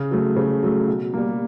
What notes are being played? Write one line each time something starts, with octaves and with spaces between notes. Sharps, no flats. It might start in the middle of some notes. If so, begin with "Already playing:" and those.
Already playing: C#3
F#3 A3
C#3
F#3 A3
B2
G3 A#3